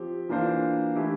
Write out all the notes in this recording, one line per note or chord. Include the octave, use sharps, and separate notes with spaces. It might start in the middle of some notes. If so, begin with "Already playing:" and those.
Already playing: F3 C4 G4
E3 A#3 D4 F4 C5
E3 A3 E4 G4